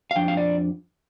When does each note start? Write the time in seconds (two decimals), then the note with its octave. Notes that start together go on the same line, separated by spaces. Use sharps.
0.11 F5
0.15 F2 F3 D4 G5
0.28 F5
0.37 D5